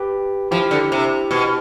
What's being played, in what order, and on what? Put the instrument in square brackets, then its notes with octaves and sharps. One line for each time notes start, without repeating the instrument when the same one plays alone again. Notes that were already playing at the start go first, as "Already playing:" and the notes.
Already playing: [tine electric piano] G4 B4
[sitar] F3 [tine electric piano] E4 G4
[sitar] D3
C3
B2